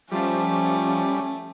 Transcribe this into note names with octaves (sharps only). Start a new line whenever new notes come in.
F3 G3 A3 C#4